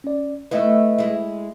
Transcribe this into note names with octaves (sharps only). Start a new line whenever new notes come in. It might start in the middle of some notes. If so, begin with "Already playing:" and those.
C#4 D5
A3 B3 E4 B4 D#5 E5
G#3 E4